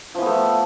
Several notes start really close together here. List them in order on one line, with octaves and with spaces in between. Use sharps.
F3 E3 B3 A3